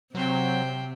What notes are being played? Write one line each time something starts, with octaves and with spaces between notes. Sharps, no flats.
C3 F#3 C4 C5 G5